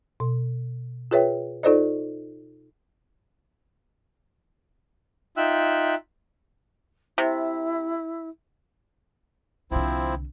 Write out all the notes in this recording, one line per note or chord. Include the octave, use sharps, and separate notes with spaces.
B2
F4 G#4 B4 C#5 E5 G5
D#4 F4 A4 C5 D5 D#5
D#4 F4 E5 G5 E6 F#6
C3 E4
C2 D3 F3 C4 E4